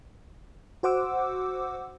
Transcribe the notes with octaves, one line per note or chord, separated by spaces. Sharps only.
F#4 C5 F#5 D6 E6